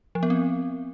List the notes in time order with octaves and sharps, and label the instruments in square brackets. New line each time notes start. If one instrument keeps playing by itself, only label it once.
[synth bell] F3
B3
C4